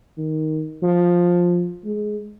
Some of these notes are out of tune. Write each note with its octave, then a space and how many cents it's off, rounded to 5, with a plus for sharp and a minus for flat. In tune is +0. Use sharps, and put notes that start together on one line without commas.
D#3 +5
F3 +10
G#3 +15